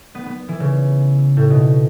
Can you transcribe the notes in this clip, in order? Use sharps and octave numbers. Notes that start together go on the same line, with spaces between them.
B3
B3
E3
C#3
A2
B2